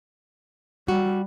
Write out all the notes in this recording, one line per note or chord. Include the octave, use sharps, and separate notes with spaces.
G3 F#4